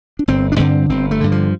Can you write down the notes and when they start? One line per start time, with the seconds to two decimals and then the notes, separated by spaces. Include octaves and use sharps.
0.19 D4
0.28 G1 C4
0.52 D4
0.59 G2 D3 C4
0.90 G1 C4
1.11 A3
1.21 G2 D3
1.32 F3